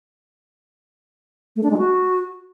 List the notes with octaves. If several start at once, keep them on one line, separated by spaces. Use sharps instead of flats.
A3
D4
G#3
F#4